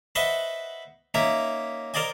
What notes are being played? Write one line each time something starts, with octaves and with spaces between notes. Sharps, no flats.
B4 C5 D#5 E5 F#5 C#6
A#3 C#4 D#4 E5 A#5
A#4 C5 D5 D#5 G#5